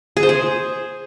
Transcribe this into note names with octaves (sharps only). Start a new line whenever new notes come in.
G#4
C5
G#4